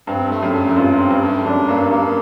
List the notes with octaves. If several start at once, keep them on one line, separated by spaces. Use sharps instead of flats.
G2 C4
A3
F#2
A3
F#2
G2 F4
C4
G2
A3
F#2 D4
G2 A#3
G2 A#3